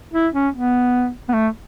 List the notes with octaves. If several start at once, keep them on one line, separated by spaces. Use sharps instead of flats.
E4
C#4
B3
B3
A3